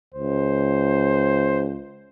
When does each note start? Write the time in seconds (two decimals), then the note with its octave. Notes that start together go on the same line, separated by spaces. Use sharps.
0.14 C#2 C5